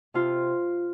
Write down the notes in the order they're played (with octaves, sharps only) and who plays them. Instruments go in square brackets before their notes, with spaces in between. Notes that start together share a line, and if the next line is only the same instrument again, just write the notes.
[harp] C3 F4